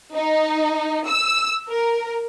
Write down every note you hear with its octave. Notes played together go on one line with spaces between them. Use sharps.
D#4
E6
A#4